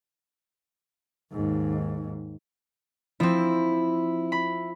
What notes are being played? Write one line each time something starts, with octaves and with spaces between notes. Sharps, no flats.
D#2 G#2
F3 C4 E4
B5